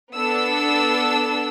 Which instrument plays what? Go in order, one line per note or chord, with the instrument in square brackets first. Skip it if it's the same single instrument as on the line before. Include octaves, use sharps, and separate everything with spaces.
[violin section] B3 D4 A4 E6